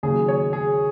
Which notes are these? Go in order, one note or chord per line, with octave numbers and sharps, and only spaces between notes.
D#2 C#3 F#3 G#4
C#5
G#4